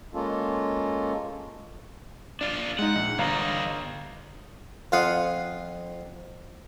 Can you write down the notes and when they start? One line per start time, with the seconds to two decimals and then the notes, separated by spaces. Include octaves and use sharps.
0.14 G#3 A#3 C#4 F4 A4
2.41 D4 F4 D5
2.79 G#3 D#4 F#5
2.95 A#1
3.18 G1 G3 D#5 F5 A#5
4.92 F2 F4 F5 F#5 D#6